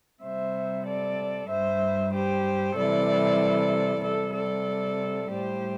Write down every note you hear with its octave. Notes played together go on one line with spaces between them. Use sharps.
C3 G3 C5 E5
A4 D5
G2 G3 C5 E5
G4 C5
C3 E3 G3 A4 D5
C3 G3 A4 D5
A4 D5
A2 G3 G4 C5